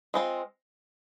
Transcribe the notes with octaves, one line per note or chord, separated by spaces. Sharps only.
G#3 C4 F4